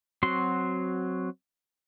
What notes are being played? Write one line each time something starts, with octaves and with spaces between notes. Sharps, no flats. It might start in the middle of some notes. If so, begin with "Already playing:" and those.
F#3 C4 F#4 C6